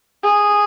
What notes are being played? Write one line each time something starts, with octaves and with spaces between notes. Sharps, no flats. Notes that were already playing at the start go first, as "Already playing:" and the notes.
G#4